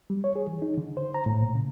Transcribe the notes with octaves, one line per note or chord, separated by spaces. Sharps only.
G3
C#5
G#4
E3
D#4
D3
C5
A#5
A2
A#2
C#3